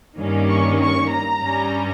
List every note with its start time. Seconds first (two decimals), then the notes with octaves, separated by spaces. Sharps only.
0.18 G2 D#3 A#3 C#4
0.49 C#6
0.81 C#6
1.11 A#5
1.42 G2 G3 C#4